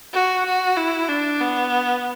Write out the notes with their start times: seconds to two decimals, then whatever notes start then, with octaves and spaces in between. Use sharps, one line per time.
0.14 F#4
0.46 F#4
0.77 E4
1.09 D4
1.41 B3